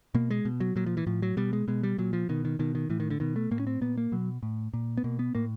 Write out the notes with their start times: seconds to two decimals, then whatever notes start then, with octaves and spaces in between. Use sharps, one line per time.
0.15 B2 A#3
0.30 G#3
0.45 B2
0.60 F#3
0.76 A#2 F#3
0.86 F3
0.97 E3
1.07 A2 F3
1.22 F#3
1.37 B2 G3
1.53 G#3
1.68 B2 G#3
1.83 G3
1.98 A#2 F#3
2.13 F3
2.29 B2 D#3
2.45 D#3
2.59 B2 D#3
2.75 D#3
2.90 A2 E3
3.00 D#3
3.10 D3
3.20 B2 D#3
3.36 A3
3.51 A2 A#3
3.60 C#4
3.67 C4
3.81 A#2 B3
3.98 A#3
4.12 B2 F#3
4.43 A2
4.73 A#2
4.97 B3
5.04 B2 A#3
5.19 B3
5.35 A2 A#3